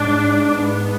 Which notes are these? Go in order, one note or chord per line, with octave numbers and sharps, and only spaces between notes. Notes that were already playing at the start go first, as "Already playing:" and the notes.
Already playing: G#2 D4
B3